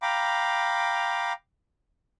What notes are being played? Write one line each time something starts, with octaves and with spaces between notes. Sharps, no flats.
F5 G5 A#5 B5 D6